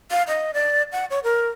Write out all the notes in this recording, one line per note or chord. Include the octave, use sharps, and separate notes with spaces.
F5
D#5
D5
F#5
C#5
A#4